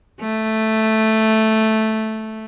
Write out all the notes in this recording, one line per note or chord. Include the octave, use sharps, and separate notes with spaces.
A3